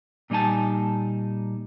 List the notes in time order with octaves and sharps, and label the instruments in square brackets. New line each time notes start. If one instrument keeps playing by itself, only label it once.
[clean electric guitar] A#2 G3 D#4 G#5 A5